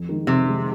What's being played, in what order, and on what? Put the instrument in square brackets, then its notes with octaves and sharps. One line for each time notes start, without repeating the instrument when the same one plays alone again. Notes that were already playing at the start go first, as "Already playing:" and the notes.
Already playing: [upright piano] F2
D#3 G#3
[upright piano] F2 [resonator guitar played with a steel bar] C3
[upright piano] D#3 G#3